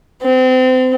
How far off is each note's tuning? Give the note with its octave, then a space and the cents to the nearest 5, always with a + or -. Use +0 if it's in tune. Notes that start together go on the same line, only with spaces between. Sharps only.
C4 -30